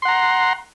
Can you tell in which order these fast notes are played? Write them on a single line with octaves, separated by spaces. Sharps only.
C6 F#5 A#5